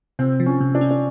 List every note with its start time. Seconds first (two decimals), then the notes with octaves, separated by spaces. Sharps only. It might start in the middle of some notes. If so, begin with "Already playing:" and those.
0.19 C3 C4
0.40 F3
0.46 C#4
0.61 C3
0.75 D4
0.81 C#4
0.91 D4